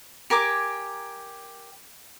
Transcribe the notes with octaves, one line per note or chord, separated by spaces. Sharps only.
G4 A#4 G#5 D6